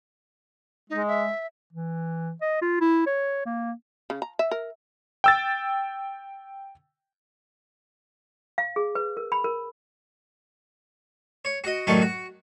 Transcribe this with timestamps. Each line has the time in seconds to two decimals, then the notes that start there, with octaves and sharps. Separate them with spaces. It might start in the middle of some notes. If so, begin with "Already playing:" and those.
0.90 G#3 D#4
1.08 E5
1.72 E3
2.41 D#5
2.62 F4
2.81 E4
3.07 C#5
3.46 A#3
4.10 C#3
4.22 A#5
4.39 E5
4.51 A#4
5.24 G5 E6 A6
8.58 F5
8.76 G#4
8.95 B4
9.17 A#4
9.32 B5
9.44 A#4
11.45 C#5
11.64 F#4 D#5
11.87 A1 F#2 D#3 A3 D5 C#6
12.02 F#4